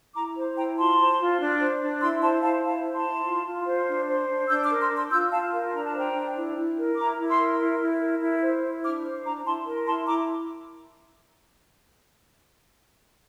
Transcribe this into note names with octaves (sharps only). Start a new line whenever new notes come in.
E4 A#5 D6
C5
E4 G5 A#5
F4 A5 C6
C5
F4
D4
C5
D4
E4 C6 E6
C5 A5 C6
E4 F5 A5
E4 F5 A5
C5
A5 C6
E4
F4
F4
C5
D4
C5
D4
D4 E6 G6
D6 F6
A#4
C6 E6
D4
C6 E6
F4 E6 G6
F4 F5 A5
A#4
D4 A#5
A5
C5 G5 A#5
D4
E4
E4
A#4
E4 A#5 D6
E4
C6 E6
A#4
E4
E4
A#4
E4
C5
E4
D4 D6 F6
C5
D4 A#5 D6
E4 A5 C6
A#4
E4 A5 C6
E4 A#5 D6